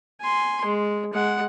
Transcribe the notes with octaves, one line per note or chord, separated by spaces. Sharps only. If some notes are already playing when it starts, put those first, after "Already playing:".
G#5 C6
G#3
G#3 F#5